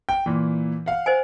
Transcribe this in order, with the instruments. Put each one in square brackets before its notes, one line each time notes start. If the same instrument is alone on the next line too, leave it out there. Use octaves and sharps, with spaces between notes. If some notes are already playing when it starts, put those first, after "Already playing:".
[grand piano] G5
A#2 E3
F5 F#5
[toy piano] C5 D#5 G#5